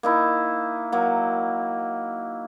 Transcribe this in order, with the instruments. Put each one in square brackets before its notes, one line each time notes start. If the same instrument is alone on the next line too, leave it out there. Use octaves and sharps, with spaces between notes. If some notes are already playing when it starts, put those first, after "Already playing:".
[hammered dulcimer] A#3 D#4 E4
F#3 A#3